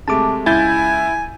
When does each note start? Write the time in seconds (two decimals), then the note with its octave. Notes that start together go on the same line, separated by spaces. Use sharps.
0.08 C3 G#3 A3 A5 D6
0.46 C#2 E4 G#5 G6 A6